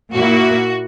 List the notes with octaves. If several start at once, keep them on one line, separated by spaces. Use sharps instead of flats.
A#2 A#3 E4 F#4